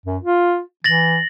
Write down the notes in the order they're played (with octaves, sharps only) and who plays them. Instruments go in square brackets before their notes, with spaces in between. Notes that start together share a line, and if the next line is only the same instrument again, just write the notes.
[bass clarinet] F#2
F4
[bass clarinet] E3 [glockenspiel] A6 A#6 F#7